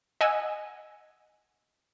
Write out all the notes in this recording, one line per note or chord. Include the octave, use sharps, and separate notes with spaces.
D#5 F#5 G#5 E6